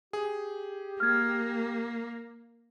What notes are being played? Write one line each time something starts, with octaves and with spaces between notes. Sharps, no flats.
G4 G#4
A#3 F6 G#6